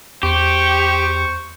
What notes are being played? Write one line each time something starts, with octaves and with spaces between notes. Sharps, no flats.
E2 G4 C5 C#6